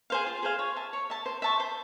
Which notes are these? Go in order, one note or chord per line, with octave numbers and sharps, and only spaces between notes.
G#4 C5 F5
F4
G#4 C5 F5
C#5
E5 A5
C#5
E5 A5
C5
E5 A5 C#6
C5